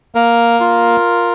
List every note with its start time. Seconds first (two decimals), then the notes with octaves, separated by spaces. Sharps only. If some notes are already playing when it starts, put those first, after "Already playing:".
0.15 A#3 A#4
0.60 F4